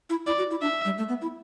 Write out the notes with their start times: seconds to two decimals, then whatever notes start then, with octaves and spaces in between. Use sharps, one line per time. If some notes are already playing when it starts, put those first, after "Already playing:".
0.10 E4
0.27 E4 D5
0.38 F#4
0.51 E4
0.62 D4 E5
0.85 G3
0.98 A3
1.09 B3
1.22 E4